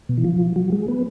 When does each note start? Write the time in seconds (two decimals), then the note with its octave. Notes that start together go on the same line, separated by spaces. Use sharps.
0.09 B2
0.18 E3
0.24 F3
0.56 F#3
0.72 G#3
0.88 B3